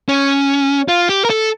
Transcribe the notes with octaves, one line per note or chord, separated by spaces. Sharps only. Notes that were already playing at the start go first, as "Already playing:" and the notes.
C#4
F4
G4
A#4
A4